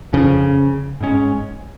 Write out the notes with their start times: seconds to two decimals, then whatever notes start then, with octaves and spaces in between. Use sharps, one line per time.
0.13 F2 C#3 F3 C#4
1.00 G#2 G#3 C#4